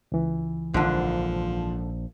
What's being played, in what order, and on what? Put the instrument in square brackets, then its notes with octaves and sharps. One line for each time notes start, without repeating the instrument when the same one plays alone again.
[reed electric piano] C#2 E3
[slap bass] A#1 [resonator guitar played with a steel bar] G#2 D3 [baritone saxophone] F3